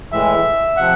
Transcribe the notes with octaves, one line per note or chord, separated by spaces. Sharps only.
A2 E3 G#3 E5
C3 F3 F#5